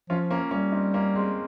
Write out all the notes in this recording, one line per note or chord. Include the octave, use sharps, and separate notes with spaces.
F3 C#4 F4
A#3 C#4
G3 A#3 C#4
C4 D#4
A#3 C#4
G#3 C4